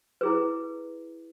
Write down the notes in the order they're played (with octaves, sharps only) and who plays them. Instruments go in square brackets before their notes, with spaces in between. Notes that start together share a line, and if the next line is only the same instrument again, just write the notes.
[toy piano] E4 G#4 B4